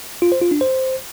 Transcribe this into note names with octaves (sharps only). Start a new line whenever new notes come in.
F4
C5
F4
D4
C5